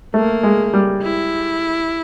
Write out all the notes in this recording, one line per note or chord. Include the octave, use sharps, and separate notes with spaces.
A3 A#3
G#3
G3
E4